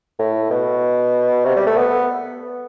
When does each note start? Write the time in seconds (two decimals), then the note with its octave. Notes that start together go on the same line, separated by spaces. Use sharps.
0.19 A2
0.51 B2
1.45 C3
1.56 G3
1.66 A3
1.77 B3